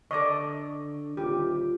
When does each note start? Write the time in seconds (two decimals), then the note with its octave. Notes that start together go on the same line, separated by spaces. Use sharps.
0.11 D3 A4 D5 D#5 C#6 D6
1.17 D#1 F4 G4